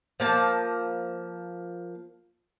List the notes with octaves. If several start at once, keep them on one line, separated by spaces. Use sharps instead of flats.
F3 A#3 A5